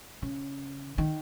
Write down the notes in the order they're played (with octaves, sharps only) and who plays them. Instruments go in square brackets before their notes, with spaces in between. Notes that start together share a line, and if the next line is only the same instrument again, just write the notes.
[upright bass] C#3
D#3